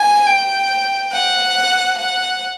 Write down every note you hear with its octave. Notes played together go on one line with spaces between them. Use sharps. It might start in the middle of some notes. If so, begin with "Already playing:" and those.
Already playing: G#5
G5
F#5
F#5